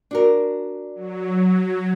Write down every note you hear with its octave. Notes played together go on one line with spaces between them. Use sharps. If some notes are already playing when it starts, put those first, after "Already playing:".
D4 F#4 A#4
F#3